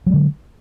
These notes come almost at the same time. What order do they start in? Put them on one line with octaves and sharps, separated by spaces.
F#3 G#3 D3